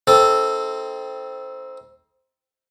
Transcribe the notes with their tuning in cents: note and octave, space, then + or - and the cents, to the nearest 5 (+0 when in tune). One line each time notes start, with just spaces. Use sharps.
C4 +0 D#4 +40 A4 +0